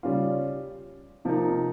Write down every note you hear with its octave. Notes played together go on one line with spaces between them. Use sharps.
C#3 G3 C#4 F4
C3 F3 A#3 D#4